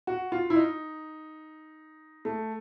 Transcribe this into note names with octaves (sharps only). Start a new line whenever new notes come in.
F#4
F4
E4
D#4
A3